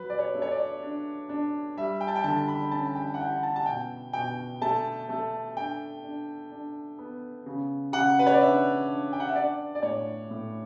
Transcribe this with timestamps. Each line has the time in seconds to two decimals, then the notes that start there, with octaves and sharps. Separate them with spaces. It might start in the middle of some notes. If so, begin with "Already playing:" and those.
Already playing: F#3 B4
0.10 D5
0.19 C#5
0.34 A3
0.42 C#5
0.51 D5
0.83 D4
1.29 D4
1.77 G3 E5
2.01 G5
2.08 A5
2.16 G5
2.24 D3 A5
2.48 B5
2.71 C#4 A5
2.95 G5
3.14 F#5
3.19 E4 G5
3.43 A5
3.56 A5
3.66 B2 G5
4.13 B2 G5
4.61 A3 A5
5.09 A3
5.57 D4 G5
6.04 D4
6.51 D4
6.98 B3
7.46 C#3
7.93 C#3 F#5
8.19 B4
8.26 C#5
8.34 D5
8.41 D4 E5
8.88 D4
9.13 G5
9.20 F#5
9.28 E5
9.35 D4 D5
9.75 D5
9.82 A2 C#5
10.30 A2